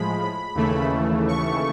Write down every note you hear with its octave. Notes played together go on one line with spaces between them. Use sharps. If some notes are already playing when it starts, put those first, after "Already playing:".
Already playing: A2 F3 G#3 B5
D#2 C#3 E3 A3
C#6